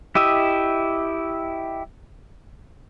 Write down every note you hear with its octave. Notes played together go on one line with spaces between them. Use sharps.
E4 G4 D#5 E5